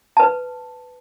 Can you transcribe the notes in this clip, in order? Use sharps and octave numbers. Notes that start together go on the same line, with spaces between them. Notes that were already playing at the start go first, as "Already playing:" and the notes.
B4 A5